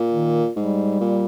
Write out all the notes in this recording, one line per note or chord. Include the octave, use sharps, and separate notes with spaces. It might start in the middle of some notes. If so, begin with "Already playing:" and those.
Already playing: A#2
D#3
G#2 G3
A#2